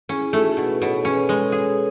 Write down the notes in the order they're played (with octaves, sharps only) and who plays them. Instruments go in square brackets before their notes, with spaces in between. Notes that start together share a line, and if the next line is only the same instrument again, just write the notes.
[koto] C#4 [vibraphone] E4 G#4
[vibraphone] G#4
[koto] A3 [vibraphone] D#4 F#4
[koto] B2 [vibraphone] G#4 B4
[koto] B2 [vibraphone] A4 C#5
[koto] C#4 [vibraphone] G#4 B4
[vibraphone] A4 C#5
[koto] G#3 [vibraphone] G#4 B4
[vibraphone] A4 C#5
[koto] G#4